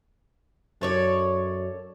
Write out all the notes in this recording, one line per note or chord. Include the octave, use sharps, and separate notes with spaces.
F#2 A4 C#5 D5